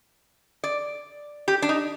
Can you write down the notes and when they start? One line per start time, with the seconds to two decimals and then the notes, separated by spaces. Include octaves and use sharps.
0.64 D5
1.48 G4
1.62 D4
1.69 D#4